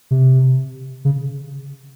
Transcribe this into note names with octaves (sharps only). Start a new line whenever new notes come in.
C3
C#3